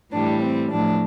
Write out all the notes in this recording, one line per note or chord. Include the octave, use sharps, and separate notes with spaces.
A2 E3 G3 D4
C4
A2 F3 D4